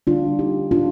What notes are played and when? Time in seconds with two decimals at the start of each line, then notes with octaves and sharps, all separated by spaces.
0.07 D3 G3 D4 F4
0.39 D#4 G4
0.71 D4 F4